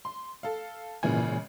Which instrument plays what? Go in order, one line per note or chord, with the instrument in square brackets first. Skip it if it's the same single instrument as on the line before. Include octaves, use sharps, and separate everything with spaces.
[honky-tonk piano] C6
A4 F5
[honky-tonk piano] G#1 C#3 [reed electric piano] A#2 E3 G#5